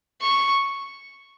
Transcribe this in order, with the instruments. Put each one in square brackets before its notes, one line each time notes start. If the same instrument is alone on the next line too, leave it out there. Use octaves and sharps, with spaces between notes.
[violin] C#6